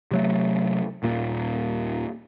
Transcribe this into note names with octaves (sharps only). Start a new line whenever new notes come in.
C3 F#3 A3
D#1 A#2 A#3